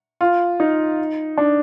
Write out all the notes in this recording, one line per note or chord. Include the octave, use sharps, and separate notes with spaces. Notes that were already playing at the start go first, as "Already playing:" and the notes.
F4
D#4
D4